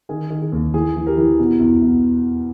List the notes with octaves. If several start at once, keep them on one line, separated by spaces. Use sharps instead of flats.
D#3 G#4
D#3
G#4
D#2
E3 G#4
E3
G4 A#4
E3
B2
E2
E2